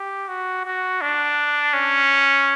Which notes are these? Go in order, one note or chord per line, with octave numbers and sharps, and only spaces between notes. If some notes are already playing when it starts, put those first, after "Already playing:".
Already playing: G4
F#4
F#4
D4
C#4